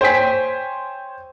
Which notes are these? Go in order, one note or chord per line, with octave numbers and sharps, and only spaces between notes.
C5 C#5 G5 G#5 B6